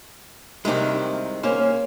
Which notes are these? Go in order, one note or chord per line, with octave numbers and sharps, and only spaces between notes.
C2 C3 D#3 G#3
A#3 C#4 C5